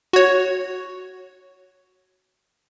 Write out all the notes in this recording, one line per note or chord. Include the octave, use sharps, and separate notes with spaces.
F#4 C#5